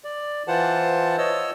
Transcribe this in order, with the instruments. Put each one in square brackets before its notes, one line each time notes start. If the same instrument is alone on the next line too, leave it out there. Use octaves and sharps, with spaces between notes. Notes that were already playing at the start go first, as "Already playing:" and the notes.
[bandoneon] D5
E3 F4 C5 F#5 A5
C#5 D#5 E6